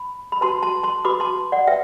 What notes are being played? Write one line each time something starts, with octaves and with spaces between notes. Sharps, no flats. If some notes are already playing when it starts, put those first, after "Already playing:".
Already playing: B5
B5
F#4 B4 A5 C6
A5 C6
A5 C6
F#4 B4 B5 D6
A5 C6
D5 F#5
B4 E5 G5